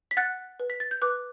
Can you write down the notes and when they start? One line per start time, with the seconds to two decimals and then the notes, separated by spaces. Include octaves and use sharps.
0.11 B6
0.17 F#5 F#6 A6
0.60 B4
0.70 B6
0.80 A6
0.91 G6
1.02 B4 D6 F#6